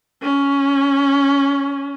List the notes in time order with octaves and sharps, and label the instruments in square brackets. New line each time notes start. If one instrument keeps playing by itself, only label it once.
[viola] C#4